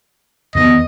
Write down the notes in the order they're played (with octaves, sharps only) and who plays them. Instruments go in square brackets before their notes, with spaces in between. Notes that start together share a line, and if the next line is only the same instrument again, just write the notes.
[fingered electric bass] E2 D#3 B3 [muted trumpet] D#5